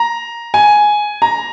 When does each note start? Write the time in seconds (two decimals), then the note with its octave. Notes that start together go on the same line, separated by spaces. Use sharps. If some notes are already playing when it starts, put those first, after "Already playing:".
Already playing: A#5
0.54 G#5
1.22 A#5